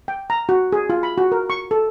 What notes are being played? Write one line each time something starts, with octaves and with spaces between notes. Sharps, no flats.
G5
A#5
F#4
G#4
F4
B5
F#4
A#4
C#6
A4